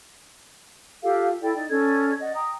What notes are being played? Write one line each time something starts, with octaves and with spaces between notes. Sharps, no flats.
F4 G4 A4 F5
E4 A4 D5 G5
D#4 D5
C#4 A4 D5 G#6
D5 D#5 F#5
G5 A#5 D#6